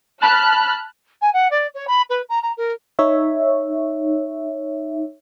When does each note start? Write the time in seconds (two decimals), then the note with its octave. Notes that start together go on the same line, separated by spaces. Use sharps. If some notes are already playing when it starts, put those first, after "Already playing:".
0.22 A5 B5 F6 F#6 B6
1.21 G#5
1.33 F#5
1.50 D5
1.74 C#5
1.87 B5
2.09 B4
2.29 A#5
2.42 A#5
2.57 A#4
2.99 D#4 C#5 E5